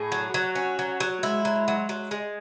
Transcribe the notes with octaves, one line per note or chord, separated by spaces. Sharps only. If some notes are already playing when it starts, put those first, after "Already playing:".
Already playing: A2 G#4
F#3
F#3 F#4
C#4
F#3
F#3
G#3 E4
F#3
F#3
F#3
G#3